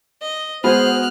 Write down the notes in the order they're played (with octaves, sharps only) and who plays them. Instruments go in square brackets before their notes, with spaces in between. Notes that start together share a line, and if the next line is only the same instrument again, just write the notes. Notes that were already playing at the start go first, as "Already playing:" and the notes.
[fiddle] D#5
[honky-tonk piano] G#3 F#4 [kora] B3 G#4 [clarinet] C5 [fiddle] F6 F#6